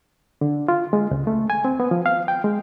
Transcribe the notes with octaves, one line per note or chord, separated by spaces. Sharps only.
D3
F4
G#3
C#2
A3
G#5
C4
B3
F3
F5
G5
G#3